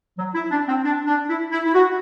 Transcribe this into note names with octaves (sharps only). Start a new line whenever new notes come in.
F#3
E4
D4
C4
D4
D4
E4
E4
E4
F#4